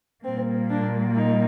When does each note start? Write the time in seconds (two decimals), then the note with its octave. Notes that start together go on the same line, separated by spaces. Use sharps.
0.24 A#2 G3 A#3 C4
0.70 D4
1.16 D#4